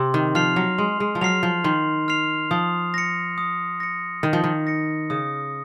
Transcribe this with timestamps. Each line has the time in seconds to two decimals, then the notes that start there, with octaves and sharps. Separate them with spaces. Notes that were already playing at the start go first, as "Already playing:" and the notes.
Already playing: C3 C6
0.14 D#3
0.35 F3 F6 C7 F7
0.56 F#3
0.78 G#3 C6
1.00 G#3
1.15 F3
1.21 F#3 F6 C7 F7
1.43 F3
1.64 D#3 C6
2.08 F6 C7 F7
2.51 F3 D#6
2.94 A#6 C#7
3.38 D#6
3.80 A#6 C#7
4.23 D#3 D#6
4.33 F3
4.44 D#3
4.67 A#6 C#7
5.10 C#3 D#6